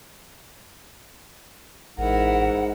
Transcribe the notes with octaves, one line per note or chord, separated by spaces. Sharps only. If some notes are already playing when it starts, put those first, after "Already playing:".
A1 G#2 E4 A#4 F#5